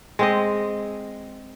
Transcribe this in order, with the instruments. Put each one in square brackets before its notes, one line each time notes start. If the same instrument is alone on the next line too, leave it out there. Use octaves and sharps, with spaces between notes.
[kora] G#3 C4 D#5